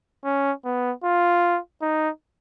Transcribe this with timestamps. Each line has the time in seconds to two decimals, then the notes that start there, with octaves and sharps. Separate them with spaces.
0.24 C#4
0.65 B3
1.04 F4
1.82 D#4